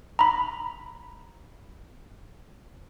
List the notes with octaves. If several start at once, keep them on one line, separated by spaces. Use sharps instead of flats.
A#5 B5